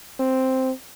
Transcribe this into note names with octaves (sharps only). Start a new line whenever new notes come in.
C4